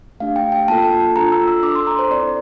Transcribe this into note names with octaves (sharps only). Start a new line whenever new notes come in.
A3 D4 G4 F5
G5
G5
A#3 F4 A4 A5
D4 F4 A4 A#5
E6
E6
D4 A4 D6
C6
A#5
C5
C4 E4 A4 D5